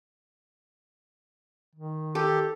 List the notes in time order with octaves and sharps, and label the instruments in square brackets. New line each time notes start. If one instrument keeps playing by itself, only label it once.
[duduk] D#3
[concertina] G4 [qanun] A4